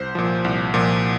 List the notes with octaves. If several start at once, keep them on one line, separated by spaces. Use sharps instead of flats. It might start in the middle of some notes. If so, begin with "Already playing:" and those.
Already playing: C2 C5
A#2 F3
C2
A#2 F3